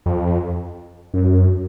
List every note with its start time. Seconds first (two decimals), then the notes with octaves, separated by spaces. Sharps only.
0.06 F2
1.14 F#2